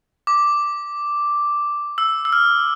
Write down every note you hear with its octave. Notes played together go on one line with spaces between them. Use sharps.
D6
E6
E6
F6